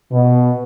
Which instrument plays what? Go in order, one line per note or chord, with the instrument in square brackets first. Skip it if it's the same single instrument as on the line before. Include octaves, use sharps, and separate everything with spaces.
[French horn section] B2